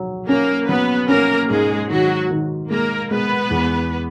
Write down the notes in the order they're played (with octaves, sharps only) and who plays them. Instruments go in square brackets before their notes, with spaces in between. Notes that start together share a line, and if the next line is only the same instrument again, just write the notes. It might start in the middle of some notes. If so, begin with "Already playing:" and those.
Already playing: [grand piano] F#3
[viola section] A#3 A#4 [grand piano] C#4
[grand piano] F#3 [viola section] B3 B4
[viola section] A#3 A#4 [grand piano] C#4
[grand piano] G#2 [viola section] G#3 G#4
[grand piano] D#3 [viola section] F#3 F#4
[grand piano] D#3
[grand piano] G#3 [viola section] A#3 A#4
[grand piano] G#3 [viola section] B3 B4
[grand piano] E2